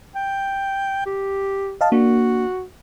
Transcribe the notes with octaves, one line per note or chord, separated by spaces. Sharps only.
G5
G4
D#5 F5 A5
A#3 D4 F#4